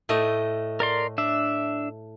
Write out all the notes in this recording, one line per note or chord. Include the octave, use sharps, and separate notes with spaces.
A2 A3 D#5
A#4 D5 C6
D4 E5